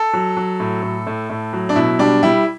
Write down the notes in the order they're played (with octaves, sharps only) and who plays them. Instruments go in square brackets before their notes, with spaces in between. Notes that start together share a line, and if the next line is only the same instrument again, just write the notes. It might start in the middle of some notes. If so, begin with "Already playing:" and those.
Already playing: [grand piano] A4
F#3
F#3
A2
A2
A2
A2
F#3
D4
B2 E4
G3 D4
G3 E4